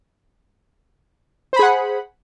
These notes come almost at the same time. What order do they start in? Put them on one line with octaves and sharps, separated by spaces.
C5 B5 G#4 F#5